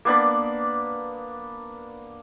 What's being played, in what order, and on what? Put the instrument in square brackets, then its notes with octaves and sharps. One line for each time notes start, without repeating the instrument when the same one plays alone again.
[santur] A#3 B3 D4 B5